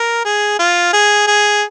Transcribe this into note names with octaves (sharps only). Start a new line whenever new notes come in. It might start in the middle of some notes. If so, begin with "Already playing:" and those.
Already playing: A#4
G#4
F4
G#4
G#4